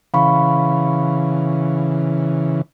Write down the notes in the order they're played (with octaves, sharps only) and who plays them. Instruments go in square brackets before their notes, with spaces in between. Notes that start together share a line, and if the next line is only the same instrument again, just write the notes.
[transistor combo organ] C#3 E3 [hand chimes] F5 B5 C#6